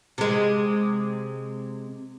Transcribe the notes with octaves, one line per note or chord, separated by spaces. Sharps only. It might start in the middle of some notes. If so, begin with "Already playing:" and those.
C3 G#3